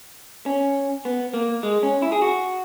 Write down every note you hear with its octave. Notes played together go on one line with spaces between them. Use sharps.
C#4
B3
A#3
G#3
C#4
E4
G#4
F#4